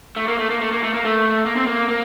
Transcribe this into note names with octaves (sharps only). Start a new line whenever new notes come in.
A3
A#3
A3
A#3
A3
A#3
A3
A#3
A3
A#3
C4
A#3
A#3